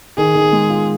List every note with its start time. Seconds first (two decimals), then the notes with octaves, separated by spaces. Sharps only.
0.18 D#3 G#4
0.35 D#3
0.52 G#3
0.70 F4